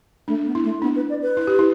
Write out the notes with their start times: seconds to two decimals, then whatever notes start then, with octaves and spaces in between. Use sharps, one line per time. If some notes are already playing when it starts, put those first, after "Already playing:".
0.28 A3 D4
0.46 B3
0.55 E4
0.64 A3
0.82 B3 D4
0.96 B4
1.10 D5
1.22 B4
1.37 E4
1.47 G4
1.59 E4